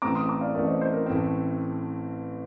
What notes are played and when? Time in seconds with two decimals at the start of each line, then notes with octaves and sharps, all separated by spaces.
0.02 A1 A2 A3 C4 A#5 D6
0.15 C6 D#6
0.29 A#5 D6
0.41 D5 F5
0.55 A1 A2 A3 C4 A#4 D5
0.67 C5 D#5
0.81 C5 D#5
0.93 A#4
1.06 A1 A2 A3 C4